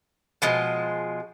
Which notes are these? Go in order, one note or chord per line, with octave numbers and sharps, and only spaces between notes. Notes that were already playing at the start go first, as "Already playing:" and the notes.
B2 F3 G#3